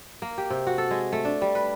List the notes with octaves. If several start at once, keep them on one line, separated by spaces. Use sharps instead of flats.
A#3
G4
C3
F#4
A4
G#3
A3
D4
G3
B4